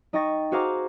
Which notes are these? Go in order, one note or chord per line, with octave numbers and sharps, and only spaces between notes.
D#4 D#5 G5 C#6 A6 A#6
F#4 G#4 C5 F5 A#5 D6